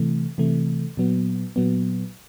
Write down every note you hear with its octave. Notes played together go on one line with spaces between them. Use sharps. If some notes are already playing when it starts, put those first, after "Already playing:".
Already playing: C3 E3 A3
C3 E3 A3
A#2 F#3 B3
A#2 F#3 B3